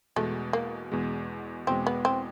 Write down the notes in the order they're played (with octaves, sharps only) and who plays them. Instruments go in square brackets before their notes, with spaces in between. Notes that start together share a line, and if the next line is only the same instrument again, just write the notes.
[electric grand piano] E2 B2 G#3 [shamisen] A3
[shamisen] A#3
[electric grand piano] E2 B2 G#3
[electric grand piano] E2 B2 G#3 [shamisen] C4
[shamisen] B3
C4